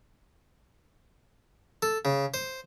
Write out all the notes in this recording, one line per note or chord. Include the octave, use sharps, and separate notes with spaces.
A4
C#3
C5